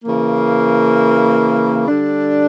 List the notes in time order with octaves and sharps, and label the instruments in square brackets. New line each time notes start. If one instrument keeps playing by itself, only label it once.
[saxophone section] C#3 E3 A#3
D3 G3 D4